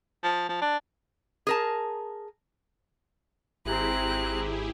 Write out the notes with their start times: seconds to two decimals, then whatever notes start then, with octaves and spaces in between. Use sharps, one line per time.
0.23 F3
0.49 F3
0.61 D4
1.47 G#4 A#4 A5
3.65 G#1 C4 E4 G4 G#4 A#5 F#6